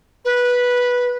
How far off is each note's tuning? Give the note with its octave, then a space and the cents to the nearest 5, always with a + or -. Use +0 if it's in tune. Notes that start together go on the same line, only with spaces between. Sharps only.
B4 -10